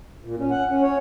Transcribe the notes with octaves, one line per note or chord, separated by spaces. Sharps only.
A#2
C#4
F#5
C#4
C#5